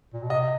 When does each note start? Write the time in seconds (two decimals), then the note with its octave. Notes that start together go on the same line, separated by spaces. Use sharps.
0.14 A#2
0.22 B2
0.30 C3 D#5